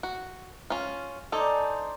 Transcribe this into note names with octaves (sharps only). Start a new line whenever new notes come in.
F#4
C#4 F4
D#4 A4 C5 D5 G#5